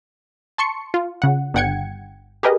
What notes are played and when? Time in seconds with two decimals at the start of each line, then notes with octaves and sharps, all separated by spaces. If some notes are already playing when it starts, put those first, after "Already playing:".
0.58 A5 C6 C#6 C#7
0.94 F4
1.22 C#3 F#5
1.54 G1 G2 F#5 G5 G#6 C#7
2.43 G4 G#4 A#4 B4 D#5